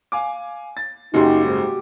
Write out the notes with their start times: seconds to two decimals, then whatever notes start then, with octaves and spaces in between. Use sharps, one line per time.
0.12 F5 G#5 D6
0.77 A6
1.14 F#1 C#3 D#4 F#4 G4 C6
1.45 G#2